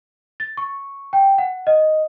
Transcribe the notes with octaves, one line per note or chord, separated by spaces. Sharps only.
A6
C#6
G5
F#5
D#5